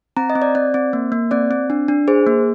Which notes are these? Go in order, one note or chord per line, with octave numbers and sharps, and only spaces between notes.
C4 A#5
D#5
C4
D5
C4 D5
C4
A#3
A#3
C4 D5
C4
D4
D4
G#4 C5
A#3